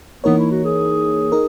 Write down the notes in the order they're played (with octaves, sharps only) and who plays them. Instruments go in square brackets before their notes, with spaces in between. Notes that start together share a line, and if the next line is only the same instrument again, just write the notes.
[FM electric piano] E3 A#3 D#4 A#4 C#5 [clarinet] B3
[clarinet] E4
F#4
G#4
[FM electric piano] D#4 A#4